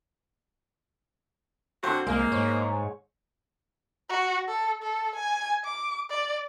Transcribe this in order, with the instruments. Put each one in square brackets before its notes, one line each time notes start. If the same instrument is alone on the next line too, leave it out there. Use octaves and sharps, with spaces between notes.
[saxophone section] F2 D3 F#4 [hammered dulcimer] C5
[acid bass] C2 [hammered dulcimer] G#3 [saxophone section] A#3
[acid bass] G#2 [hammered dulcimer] C#5
[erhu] F#4
A4
A4
G#5
D6
D5